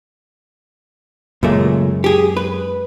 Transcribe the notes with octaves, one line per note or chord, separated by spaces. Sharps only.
C#2 F#2 A#2 G#3 A3
G4 G#4
B4